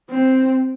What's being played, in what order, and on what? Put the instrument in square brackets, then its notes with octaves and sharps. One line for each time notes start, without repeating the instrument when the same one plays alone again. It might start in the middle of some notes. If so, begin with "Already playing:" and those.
[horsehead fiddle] C4